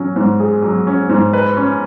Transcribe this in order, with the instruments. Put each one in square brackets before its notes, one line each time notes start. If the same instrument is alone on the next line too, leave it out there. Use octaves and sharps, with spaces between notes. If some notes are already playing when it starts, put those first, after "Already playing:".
Already playing: [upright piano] F#3 C#4
G#2
G#4
F#3
C#4
G#2
B4
C#4